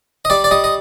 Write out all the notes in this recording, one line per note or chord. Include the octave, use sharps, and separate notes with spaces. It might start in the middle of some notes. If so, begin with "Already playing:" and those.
D#5
G3 D5
D5
G3 D#5
D#5